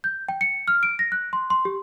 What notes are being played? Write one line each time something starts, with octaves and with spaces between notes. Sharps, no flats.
G6
G5
C#7
F6
D7
A#6
F#6
C6
C6
G4